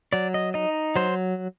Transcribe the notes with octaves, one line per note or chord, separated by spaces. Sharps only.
F#3 D5
D#5
D#4 D#5
F#3 C5